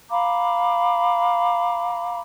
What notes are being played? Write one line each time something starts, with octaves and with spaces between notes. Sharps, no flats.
F5 A#5 B5 D6